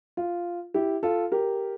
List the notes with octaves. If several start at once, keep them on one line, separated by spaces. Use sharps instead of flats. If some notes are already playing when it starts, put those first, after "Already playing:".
F4
E4 G4
F4 A4
G4 A#4